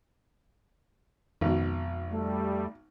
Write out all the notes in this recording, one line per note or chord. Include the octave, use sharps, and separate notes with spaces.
G#1 F2 B2
G3 A3